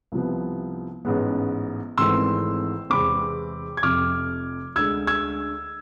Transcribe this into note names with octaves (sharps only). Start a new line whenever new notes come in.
C2 C3 F3 B3
A1 G#2 G#3 B3
G#1 G#2 E3 A3 C4 C6 E6
E2 C3 E3 G#3 C4 B5 D6
G#6
F1 F2 C3 F3 D6 F6
D2 D3 G#3 E6 G#6
E6 G#6